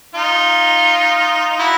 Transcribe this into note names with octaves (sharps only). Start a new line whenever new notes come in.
D#4 F4
E4 F#4